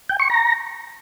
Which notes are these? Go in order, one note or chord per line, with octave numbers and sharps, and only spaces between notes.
G5
C#6
A#5